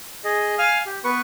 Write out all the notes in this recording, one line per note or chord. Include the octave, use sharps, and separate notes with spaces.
G#4 D#5
F5 G#5 F6
G4
B3 B4 C#6